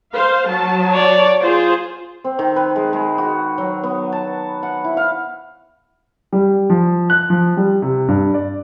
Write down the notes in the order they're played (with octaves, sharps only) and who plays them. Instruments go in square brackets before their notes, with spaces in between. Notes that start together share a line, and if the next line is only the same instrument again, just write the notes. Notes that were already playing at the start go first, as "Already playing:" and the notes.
[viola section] C5 F5
F#3 A5
[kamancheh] C#5 D5
[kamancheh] F4 G#4 [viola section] C5
[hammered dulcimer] C4
D#3
B4
G#3
G#3
F#4
F#3
B3
A5
F#5
E4
F5
[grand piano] G3
F3
F#6
F3
G3
C3
G2
D5